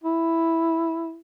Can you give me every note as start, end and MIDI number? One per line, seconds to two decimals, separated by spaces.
0.04 1.18 64